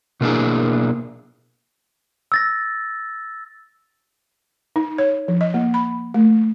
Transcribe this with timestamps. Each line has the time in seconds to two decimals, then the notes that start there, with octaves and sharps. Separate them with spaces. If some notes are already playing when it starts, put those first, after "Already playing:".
0.21 B2 A3 A#3 D4 E4 G#4
2.32 E6 A6 A#6
4.76 D#4
4.98 C#5
5.28 F3
5.41 D#5
5.54 A#3
5.74 B5
6.14 A3